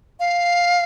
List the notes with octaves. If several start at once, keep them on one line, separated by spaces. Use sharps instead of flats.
F5